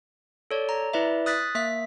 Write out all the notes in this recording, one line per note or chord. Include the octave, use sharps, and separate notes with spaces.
A4 C#5 D5
A#5
E4 B4 D5 E5
D#6 F#6 A6 B6
A#3 E5 B6